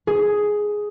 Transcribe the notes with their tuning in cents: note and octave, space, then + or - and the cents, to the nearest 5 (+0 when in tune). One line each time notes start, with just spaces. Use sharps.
G#4 +5